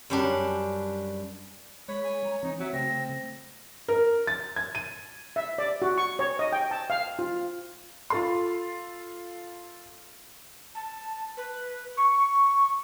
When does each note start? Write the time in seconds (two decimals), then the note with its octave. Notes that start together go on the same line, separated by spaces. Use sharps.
0.10 F#2 G3 D4
1.88 G#3 C#5 B5
2.04 G#5
2.24 A#5
2.43 E3 C4 D#4
2.60 F#3 C4 E5
2.73 C#3 A3 C4 E6 A#6
3.88 A#4
4.27 A6
4.56 G#6
4.75 D#7
5.36 E5
5.58 D5
5.82 F#4
5.98 C#6
6.19 C#5
6.39 D#5
6.52 G5
6.71 A5
6.90 F5
7.19 F4
8.10 F4 A4 C6
10.74 A5
11.37 B4
11.97 C#6